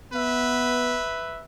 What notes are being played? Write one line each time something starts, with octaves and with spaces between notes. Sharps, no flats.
B3 B4 E5